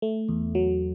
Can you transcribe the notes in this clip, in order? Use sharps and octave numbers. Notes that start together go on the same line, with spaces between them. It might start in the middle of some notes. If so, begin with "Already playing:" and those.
A3
E2
F#3